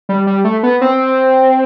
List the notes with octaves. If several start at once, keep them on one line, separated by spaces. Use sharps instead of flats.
G3
G3
A3
B3
C4